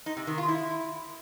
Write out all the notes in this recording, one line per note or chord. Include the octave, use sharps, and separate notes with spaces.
D#4
C3
D#3
F4
E4